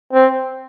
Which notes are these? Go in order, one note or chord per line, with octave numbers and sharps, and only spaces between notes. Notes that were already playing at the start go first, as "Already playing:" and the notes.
C4